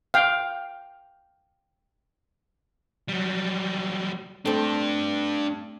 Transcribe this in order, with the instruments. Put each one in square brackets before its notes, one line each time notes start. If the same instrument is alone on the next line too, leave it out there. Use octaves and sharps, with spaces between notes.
[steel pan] F5 G5
[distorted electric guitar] F#3 G3
[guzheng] A3 C4 [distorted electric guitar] D4 G4